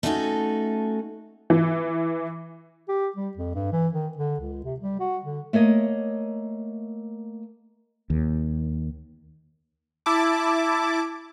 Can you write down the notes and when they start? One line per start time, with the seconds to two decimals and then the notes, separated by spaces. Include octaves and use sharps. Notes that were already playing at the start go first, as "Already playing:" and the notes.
0.03 A3 B3 C#4 D#4 F#4 A4
1.50 E3
2.88 G4
3.16 G3
3.37 F2
3.55 G2
3.73 E3
3.93 D#3
4.17 D3
4.40 C#2
4.65 C3
4.80 G3
5.00 F#4
5.24 D3
5.53 A3 A#3 C#5 D#5
8.10 D#2
10.06 E4 A5 D6